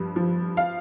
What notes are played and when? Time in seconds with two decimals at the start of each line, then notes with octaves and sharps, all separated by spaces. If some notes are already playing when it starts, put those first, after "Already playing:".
Already playing: G2 F3
0.16 F3
0.57 F5